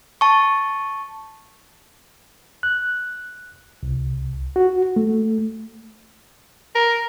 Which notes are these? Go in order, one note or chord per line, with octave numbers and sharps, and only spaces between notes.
A5 C#6
F#6
C2
F#4
A3
A#4